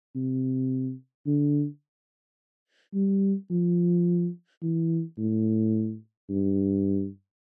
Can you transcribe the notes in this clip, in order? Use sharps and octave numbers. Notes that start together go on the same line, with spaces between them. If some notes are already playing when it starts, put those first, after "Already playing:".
C3
D3
G3
F3
E3
A2
G2